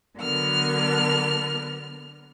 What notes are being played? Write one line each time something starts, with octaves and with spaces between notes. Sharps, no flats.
D3 F#3 B3 A#4 F6